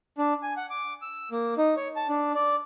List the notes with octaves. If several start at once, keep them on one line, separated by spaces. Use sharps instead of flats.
D4
G#5
F#5
D6
E6
A#3
D#4
C#5
A5
D4
D5